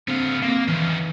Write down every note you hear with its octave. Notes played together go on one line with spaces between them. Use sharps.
D3 B3 C4 F5
A#3 C4 F5
D#3 E3 C#4